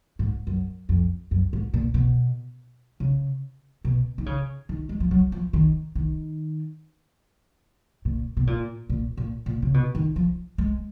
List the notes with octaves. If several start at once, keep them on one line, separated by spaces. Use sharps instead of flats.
G#2
F#2
F2
F#2
G#2
A#2
B2
C#3
B2
D#3
C#3
D#3
G#3
F3
F#3
F3
D#3
D#3
A#2
B2
A#2
A#2
A#2
A#2
C#3
B2
D#3
F3
G#3